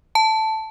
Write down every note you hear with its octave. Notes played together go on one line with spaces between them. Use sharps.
A5